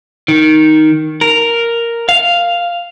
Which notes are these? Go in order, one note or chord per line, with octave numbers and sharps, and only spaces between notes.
D#3
A#4
F5